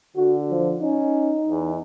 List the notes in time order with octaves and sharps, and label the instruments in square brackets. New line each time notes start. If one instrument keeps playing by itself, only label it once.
[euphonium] D3 [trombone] F#4
[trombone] F3
[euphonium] C#4 [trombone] D#4
[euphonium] E2